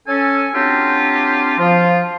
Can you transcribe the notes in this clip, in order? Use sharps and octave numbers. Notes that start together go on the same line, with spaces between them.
C#4 A4 G#5
F#3 C4 D4 F4 G4
F3 F4